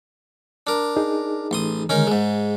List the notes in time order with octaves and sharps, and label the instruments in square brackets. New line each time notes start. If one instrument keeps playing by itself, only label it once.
[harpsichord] D4 A#4
[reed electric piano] D#4 G#4
[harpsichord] A1 C6 D#6
[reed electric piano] D3 D#3 G#3 [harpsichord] C#4 D#4 A#4
[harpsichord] G#2 G#3 [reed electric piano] G#4